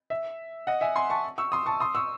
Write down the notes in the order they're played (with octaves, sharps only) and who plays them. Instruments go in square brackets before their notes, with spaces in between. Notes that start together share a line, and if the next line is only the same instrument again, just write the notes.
[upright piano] E5
D#5 F#5
E5 G#5
G#5 C6
A5 C#6
C#6 E6
C6 D#6
A5 C#6
C6 D#6
C#6 E6